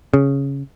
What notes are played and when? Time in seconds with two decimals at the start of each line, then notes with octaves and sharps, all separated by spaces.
0.14 C#3